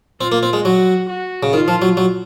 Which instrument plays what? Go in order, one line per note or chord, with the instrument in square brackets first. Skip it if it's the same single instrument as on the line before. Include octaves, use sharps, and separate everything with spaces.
[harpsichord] C4 [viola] F4
[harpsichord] A#3
C4
G#3
[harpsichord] F#3 [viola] F#4
[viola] F#4
[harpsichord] C#3
[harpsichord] D#3 [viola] F4
[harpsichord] F3
F#3
F#3